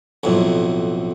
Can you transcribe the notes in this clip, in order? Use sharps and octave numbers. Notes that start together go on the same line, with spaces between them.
B1 F2 A2